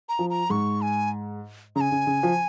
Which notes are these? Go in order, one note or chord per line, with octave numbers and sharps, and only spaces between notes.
A#5
F3
A#5
G#2 C#6
G#5
C#3 A#5
G#5
C#3
C#3
F3